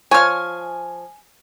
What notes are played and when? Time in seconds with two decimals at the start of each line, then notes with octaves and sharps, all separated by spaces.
0.11 F3 C#5 G#5 F6